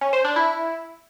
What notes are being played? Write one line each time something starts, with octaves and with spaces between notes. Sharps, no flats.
C#4
C5
D4
E4